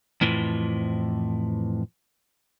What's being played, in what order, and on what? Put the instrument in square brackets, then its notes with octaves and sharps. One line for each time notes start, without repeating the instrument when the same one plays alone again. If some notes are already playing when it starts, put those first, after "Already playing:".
[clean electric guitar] F2 A2 E3 F3